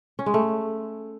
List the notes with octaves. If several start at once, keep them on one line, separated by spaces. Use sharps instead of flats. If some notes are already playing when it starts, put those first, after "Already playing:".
C#4
G#3
A3